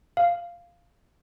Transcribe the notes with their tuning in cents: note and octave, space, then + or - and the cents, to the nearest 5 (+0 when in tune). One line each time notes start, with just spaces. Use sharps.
F5 -5